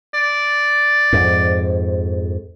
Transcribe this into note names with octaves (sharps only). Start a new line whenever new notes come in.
D5
F2 G#2